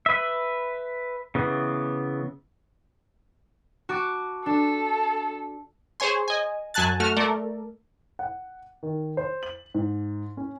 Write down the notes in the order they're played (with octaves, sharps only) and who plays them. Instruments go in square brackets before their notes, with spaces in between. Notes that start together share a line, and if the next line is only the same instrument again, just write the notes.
[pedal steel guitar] B4 E5
C#3 E3 B3
[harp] F#4 A5 D6
[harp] D4 [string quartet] A4
[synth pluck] G#4 C5 C#5 G#5 C6
D#5 G#5
F#2 F#3 G#5 A5 F#6 A6
A3 F#4 F6
A3 A4 A#4 D5
[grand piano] F#5
D#3
C5
F#7
G#2
C#4